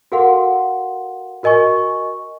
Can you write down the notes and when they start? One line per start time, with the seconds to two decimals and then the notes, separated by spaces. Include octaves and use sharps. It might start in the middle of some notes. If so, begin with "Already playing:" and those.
0.12 F#4 A4 A#4 F5 F#5 C6
1.43 F#4 A#4 D#5 G#5 C#6